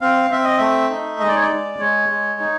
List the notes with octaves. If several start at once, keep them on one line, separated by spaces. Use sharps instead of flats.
C4 F5
C4 E5
D#5
A3 E5
D#4
G#3 D#5
D5
C#5
D5
G#3
G#3 C#5
G#3
D#4